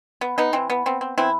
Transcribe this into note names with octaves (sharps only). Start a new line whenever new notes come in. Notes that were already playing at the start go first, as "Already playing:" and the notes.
B3
B3 D#4
E3 C4
B3
B3 C4
C4
E3 C4 E4